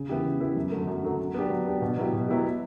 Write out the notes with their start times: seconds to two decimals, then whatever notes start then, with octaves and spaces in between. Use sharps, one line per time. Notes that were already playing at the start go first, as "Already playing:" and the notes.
Already playing: C#3
0.09 E3 B3 E4 G4
0.25 C#3
0.40 E3 B3 E4 G4
0.56 F#2
0.72 D3 F#3 A3
0.87 F#2
1.03 D3 F#3 A3
1.19 F#3
1.34 B3 D4 G4
1.50 F#3
1.66 B3 D4 G4
1.82 B2
1.97 F#3 B3 E4 G4
2.13 B2
2.28 F#3 B3 E4 G4